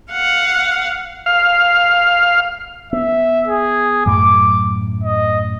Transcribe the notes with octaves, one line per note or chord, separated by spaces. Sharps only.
F5 F#5
F5
B3 E5
G#4
F#2 A2 F#3 D6
D#5